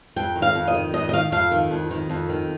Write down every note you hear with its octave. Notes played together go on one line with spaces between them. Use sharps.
F2 G5
D#3
F5
F2
D#5
D#3
F2 D#5
D#5
D#3 F5
F2 F5
D#3
F2
D#3
F2
D#3